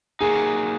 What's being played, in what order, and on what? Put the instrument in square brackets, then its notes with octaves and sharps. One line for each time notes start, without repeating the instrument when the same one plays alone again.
[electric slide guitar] F#3 A#3 D#4 [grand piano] G#4